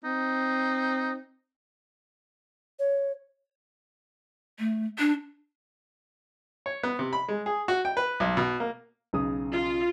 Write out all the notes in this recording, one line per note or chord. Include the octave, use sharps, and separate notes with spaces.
C4 D#4
C#5
A3
D4
C#5
B3
C3
B5
G#3
G#4
F#4
G5
B4
B1
B2
A#3
B1 C#3 D#6
F4